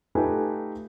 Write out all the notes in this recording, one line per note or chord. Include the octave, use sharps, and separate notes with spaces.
A3 D#4 F4 G4 B4 G#5